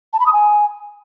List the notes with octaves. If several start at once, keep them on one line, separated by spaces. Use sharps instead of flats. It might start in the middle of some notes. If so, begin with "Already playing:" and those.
A5
B5
D#6
G#5